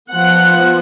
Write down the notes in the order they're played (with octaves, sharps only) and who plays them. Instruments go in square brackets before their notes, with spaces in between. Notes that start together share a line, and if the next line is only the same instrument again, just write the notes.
[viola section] F3 B3 F#5